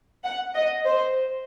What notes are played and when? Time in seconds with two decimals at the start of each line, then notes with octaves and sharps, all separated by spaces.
0.25 F#5
0.55 D#5
0.86 C5